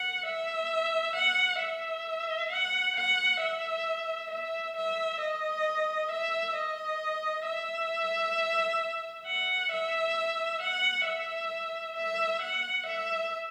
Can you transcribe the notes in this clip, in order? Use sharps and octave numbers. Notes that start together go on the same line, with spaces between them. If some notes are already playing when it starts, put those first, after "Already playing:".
Already playing: F#5
E5
F#5
E5
F#5
F#5
E5
E5
E5
D#5
E5
D#5
E5
F#5
E5
F#5
E5
E5
F#5
E5